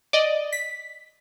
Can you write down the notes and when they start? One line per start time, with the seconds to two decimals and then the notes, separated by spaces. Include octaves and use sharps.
0.13 D5 D#5
0.53 B6